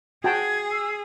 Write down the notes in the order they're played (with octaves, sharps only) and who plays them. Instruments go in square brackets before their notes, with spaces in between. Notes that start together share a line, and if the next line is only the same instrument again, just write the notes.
[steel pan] F#4 G5 A5 [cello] G#4 [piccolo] G#6
[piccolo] E6